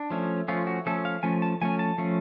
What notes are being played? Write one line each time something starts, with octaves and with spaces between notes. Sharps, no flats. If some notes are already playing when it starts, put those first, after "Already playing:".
Already playing: D4
F3 A3 C#4
F3 A3 C#4 F4
F#4
F3 A3 C#4 A4
F5
F3 A3 C#4 G#5
A5
F3 A3 C#4 G#5
A5
F3 A3 C#4